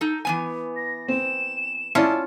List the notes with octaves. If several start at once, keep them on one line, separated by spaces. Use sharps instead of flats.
D#4 A4
E3 B3 G#5
A#6
C4 E7
C#4 E4 F4 D5 A5